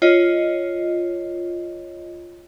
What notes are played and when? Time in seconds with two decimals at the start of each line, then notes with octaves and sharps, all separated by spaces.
0.02 F4 C#5 D#5